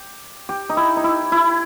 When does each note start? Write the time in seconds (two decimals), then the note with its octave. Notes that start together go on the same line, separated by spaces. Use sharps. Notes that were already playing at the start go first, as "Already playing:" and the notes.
Already playing: G4
0.49 G4
0.70 D#4
0.77 E4
0.97 D#4
1.04 E4
1.32 E4